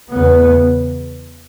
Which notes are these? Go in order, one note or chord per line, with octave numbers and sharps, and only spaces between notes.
E2 C#3 B3